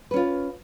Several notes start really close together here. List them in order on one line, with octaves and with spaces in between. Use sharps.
B4 C#4 F4